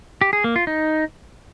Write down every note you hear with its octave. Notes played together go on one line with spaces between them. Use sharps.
G4
G#4
A#3
F4
D#4